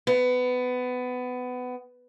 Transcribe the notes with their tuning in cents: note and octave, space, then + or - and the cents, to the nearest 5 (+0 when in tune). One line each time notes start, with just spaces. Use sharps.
B3 +20